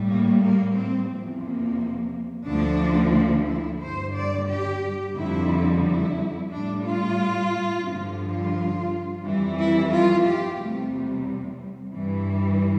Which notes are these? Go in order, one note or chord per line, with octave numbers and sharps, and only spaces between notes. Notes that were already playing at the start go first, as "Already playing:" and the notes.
Already playing: A2 G3
A#3
A#3
C4
E2 C3 F3
A#3
D2 D3 F3 D4
E4
G2 D3 G3 C5
D5
G4
F2 D3 G3 E4
E4
A2 G3 D4
F4
G2 D3 F3
F4
F2 E3 G3
E4
F4
G4
E2 C3 G3 A3
G2 E3 G3